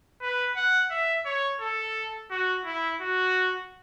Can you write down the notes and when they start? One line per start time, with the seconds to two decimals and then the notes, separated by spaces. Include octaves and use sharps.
0.21 B4
0.56 F#5
0.91 E5
1.25 C#5
1.61 A4
2.31 F#4
2.65 E4
3.01 F#4